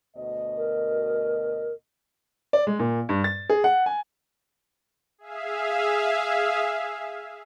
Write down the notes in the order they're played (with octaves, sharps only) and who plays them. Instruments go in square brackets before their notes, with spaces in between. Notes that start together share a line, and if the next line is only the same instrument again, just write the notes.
[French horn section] D2 B2 D#5
[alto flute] A#4
[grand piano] D5
G#3
A#2
G2
A6
G#4
F#5
G#5
[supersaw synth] G#4 E5 F5